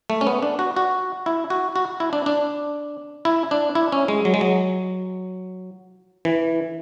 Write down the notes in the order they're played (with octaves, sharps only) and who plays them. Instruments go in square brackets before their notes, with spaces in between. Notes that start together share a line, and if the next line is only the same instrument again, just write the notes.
[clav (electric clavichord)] A3
C#4
B3
D4
F#4
F#4
E4
F#4
F#4
E4
D4
D4
E4
D4
E4
C#4
G#3
F#3
G#3
F#3
E3